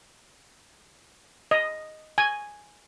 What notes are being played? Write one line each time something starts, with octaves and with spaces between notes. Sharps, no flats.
D#5
G#5